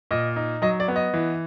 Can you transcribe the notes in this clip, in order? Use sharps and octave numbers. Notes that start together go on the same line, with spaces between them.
A#2 D#5
D#4
F#3 D#5
D5
B3
D#5
E3